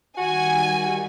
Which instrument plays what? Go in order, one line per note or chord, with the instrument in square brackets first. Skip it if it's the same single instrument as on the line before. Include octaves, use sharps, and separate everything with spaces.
[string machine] D#3 G3 [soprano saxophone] F#4 [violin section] G#5